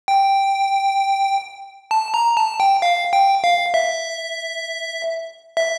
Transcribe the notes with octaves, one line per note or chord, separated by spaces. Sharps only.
G5
A5
A#5
A5
G5
F5
G5
F5
E5
E5